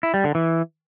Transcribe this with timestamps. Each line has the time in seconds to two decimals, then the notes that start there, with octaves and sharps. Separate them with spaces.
0.03 E4
0.14 G3
0.24 D3
0.35 E3